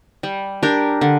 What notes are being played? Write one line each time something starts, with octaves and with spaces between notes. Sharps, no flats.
G3
D4 G4 A#4
D3